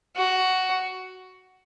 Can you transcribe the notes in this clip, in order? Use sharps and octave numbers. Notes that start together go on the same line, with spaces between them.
F#4